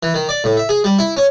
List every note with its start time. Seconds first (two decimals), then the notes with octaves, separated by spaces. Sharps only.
0.03 E3
0.14 D#3
0.29 D5
0.44 A2
0.57 E5
0.69 G#4
0.84 G3
0.99 E4
1.17 C#4